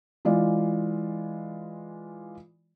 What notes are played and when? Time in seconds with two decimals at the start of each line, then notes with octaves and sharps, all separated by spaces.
0.25 E3 G#3 F4 D5